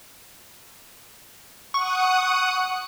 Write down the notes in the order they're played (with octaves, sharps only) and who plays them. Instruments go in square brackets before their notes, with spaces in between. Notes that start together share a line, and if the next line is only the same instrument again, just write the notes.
[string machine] F#5 D#6 [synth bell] C#6